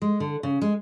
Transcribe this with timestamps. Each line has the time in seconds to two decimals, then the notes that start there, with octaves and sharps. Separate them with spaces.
0.02 G#3
0.20 D3
0.43 C#3
0.61 G#3